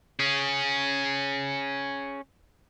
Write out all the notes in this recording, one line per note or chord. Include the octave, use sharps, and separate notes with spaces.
C#4 G#4